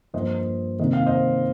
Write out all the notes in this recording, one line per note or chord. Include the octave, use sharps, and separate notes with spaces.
G2 F3 A#3 C5 D#5
C3 D#3 A#3 D#5
F5
C5 D#5